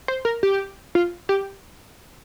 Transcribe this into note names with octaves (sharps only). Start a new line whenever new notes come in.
C5
A#4
G4
F4
G4